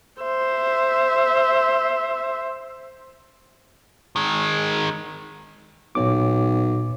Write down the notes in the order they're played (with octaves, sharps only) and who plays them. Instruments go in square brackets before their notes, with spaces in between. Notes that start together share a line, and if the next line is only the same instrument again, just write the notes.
[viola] C5 E5
[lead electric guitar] D#3 G#3
[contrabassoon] B1 [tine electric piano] A#2 C#5 D6